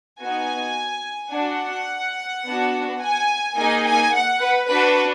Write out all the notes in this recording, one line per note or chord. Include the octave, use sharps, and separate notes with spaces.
B3 D#4 F#4 G#5
D4 F#4 F#5
B3 D4 F#4
G#5
A#3 D#4 G#4 G#5
G#5
F#5
B4
D4 F#4 B4